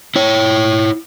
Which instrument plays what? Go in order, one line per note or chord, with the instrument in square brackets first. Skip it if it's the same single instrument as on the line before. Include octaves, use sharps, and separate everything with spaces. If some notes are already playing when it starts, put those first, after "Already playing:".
[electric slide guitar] E4 C#5